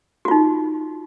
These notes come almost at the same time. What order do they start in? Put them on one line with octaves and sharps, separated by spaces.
F#4 F4 D#4